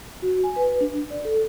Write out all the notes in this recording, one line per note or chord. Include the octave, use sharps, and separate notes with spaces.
F#4
G#5
B4
D4
D5
A4